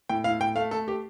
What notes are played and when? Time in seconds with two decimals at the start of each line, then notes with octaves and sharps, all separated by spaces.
0.09 A2 G5
0.24 A2 F5
0.40 A2 G5
0.56 A3 F5
0.71 A3 A4
0.88 G4